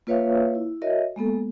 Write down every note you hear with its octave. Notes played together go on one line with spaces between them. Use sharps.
A#3 F4 B4 C#5 E5 F5
E4
F#4 A#4 C#5 D#5 E5
G#3 A#3 B3 A4